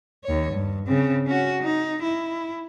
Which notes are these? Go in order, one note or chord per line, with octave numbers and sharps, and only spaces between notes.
D#2 C#5
G2
C#3 C4
C#4 F#4
D#4
E4